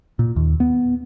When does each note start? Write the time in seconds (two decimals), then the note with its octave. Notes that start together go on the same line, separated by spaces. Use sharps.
0.19 A#2
0.36 D#2
0.60 B3